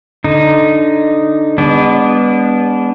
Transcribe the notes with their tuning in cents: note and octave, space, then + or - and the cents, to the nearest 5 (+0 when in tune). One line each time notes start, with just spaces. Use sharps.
D3 +0 D#4 -5
G#3 -45 B3 +0 D4 -25